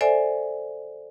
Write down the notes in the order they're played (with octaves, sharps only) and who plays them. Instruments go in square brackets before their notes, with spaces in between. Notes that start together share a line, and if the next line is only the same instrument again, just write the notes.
[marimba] A4 C5 D5 E5 G#5